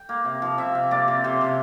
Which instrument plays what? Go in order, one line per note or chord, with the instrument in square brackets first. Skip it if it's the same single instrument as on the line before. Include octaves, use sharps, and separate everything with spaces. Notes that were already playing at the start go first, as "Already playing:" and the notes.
Already playing: [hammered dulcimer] G5
A#3
C3
F3
C3 E5
C3
A#3 D5
C3
C3 C5
C3